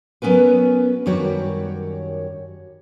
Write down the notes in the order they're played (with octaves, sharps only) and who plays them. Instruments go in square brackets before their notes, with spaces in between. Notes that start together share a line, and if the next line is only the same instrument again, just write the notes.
[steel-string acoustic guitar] F#3 B3 C#4 A#4 B4
F#2 D#3 G3 F#4 C#5 D5